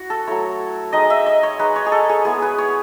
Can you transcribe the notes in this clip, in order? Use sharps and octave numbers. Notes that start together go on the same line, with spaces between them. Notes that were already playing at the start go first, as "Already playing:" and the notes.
Already playing: E4 F#4
A4
F#3 A3 E4 C#5
G#3 D#4 D#5
E5
D#5
C#5
G#3 D#4 B4
C#5
G#4
A4
G#4
G#3 B3 E4 G#4
B4
C#5